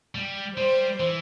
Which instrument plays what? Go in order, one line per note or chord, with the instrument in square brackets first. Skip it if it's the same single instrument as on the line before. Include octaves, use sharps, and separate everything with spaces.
[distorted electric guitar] G3
[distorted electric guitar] G3 [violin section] C5
[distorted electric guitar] E3